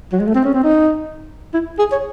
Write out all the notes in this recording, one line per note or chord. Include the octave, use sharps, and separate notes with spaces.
F#3
G#3
A3
C4
C#4
C4
D#4
E4
G#4
C#5